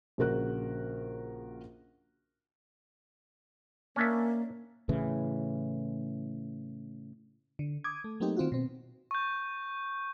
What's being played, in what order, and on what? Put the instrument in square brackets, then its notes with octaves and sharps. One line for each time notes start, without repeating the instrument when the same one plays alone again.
[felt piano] A#1 C#3 F#4 A#4 F#6
[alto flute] A#3 [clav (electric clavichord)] C#4 D4 E5
[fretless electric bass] A2 C#3 E3
[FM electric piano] D3
D6 D#6 G#6
A3
F#3 A3 A#3 C4 D#4 G4
D#3 C4 F4 F#4
B2 C4
[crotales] C#6 G6